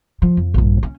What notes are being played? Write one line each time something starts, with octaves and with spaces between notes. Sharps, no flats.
F3
F2
A#1 G2
C#4